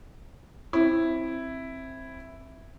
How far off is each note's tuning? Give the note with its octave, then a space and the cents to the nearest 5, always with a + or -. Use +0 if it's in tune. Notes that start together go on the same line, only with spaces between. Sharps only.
C4 +15 E4 +0